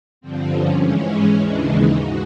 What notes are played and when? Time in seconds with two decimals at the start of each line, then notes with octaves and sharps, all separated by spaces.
0.21 G2 D3 F3 C4
0.50 C#4
0.79 G#2 E3 G#3 C#4
1.37 D#2 C#3 E3 G#3 D4
1.66 D#4
1.94 G#2 F#4